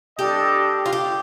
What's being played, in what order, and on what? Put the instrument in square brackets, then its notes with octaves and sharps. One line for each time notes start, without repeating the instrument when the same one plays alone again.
[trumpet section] G3 D4 A4 D#5 G5 [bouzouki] G4
[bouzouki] F4
G4